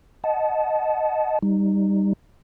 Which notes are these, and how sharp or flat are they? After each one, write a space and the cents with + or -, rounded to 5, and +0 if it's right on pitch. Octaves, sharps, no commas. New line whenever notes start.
D#5 +0 F#5 +0 A5 -25
G3 +5 D#4 -10